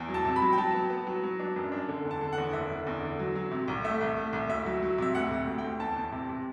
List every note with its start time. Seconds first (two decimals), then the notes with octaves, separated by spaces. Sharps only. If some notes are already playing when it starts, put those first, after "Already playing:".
Already playing: E2
0.09 F#3
0.14 A5
0.25 C3
0.36 B5
0.42 F#3
0.53 G5
0.58 F#3 A5
0.74 B3
0.90 B3
1.07 F#3
1.24 F#3
1.39 D4
1.56 F#2
1.72 D4
1.88 D3
2.05 E2
2.11 A5
2.21 D3
2.33 F#5
2.38 E2
2.53 F#1 E5
2.70 D3
2.87 E2
3.03 D3
3.19 F#3
3.35 F#3
3.51 C3
3.68 C2
3.84 A3 E5
4.01 C2
4.17 A3
4.33 C2
4.49 D2 E5
4.66 F#3
4.83 F#3
4.98 C3 E5
5.15 D2 F#5
5.31 C3
5.47 D2
5.58 G5
5.64 D2
5.80 E2 A5
5.96 E2
6.12 C3
6.29 C3